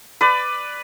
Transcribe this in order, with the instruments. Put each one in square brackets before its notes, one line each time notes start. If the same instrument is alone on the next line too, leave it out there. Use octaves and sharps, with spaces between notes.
[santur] B4 D5